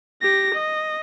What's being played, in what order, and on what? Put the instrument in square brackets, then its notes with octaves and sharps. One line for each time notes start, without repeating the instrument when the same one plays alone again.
[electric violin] G4 A#6
D#5